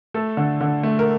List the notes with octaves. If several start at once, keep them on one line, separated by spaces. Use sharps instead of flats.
A3 A4
D3
D3
A3
A#4